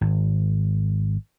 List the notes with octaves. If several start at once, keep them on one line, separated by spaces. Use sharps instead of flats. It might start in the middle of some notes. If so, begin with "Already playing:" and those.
G#1